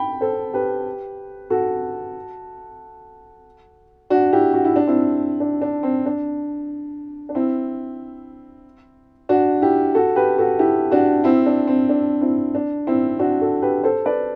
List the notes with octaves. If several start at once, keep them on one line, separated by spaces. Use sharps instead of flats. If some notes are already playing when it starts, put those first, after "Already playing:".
Already playing: G5 B5
A4 C5
G4 B4
F#4 A4
D4 F#4
E4 G4
F#4
E4
D4
C4 E4
D4
D4
C4
D4
D4
C4 E4
D4 F#4
E4 G4
F#4 A4
G4 B4
F#4 A4
E4 G4
D4 F#4
C4 E4
D4
C4
D4
C4 E4
D4
C4 E4
D4 F#4
F#4 A4
G4 B4
A4 C5
B4 D5